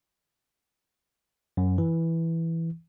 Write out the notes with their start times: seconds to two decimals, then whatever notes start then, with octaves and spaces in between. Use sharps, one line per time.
1.57 F#2
1.78 E3